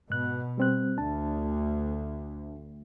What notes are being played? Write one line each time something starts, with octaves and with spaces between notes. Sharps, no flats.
G#2 B2 F#6
G3 C4 F#6
D2 D4 A5